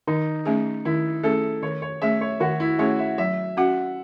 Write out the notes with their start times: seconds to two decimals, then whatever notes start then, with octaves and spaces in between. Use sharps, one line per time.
0.07 D#3 D#4
0.46 A3 C#4 G#4
0.85 D#3 E4
1.23 A3 C#4 G#4 A4
1.63 D#3 C#5
1.82 C#5
2.02 A3 C#4 G#4 E5
2.21 C#5
2.40 D#3 F#4
2.60 E4
2.79 A3 C#4 G#4 C#5
2.99 E5
3.18 F#3 E5
3.57 C#4 F#4 F#5